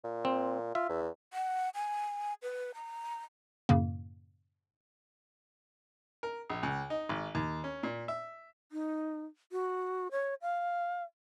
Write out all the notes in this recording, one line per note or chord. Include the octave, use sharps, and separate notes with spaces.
A#2
C4
F4 E5
E2
F#5
G#5
B4
A#5
F#2 A2 C#3 A#3
A#4
A#1
C#2
D#4
G#1
D#2
C#4
A#2
E5
D#4
F#4
C#5
F5